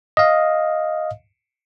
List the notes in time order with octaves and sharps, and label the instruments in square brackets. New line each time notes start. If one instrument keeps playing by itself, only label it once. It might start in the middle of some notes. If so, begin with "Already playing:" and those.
[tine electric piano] D#5 F5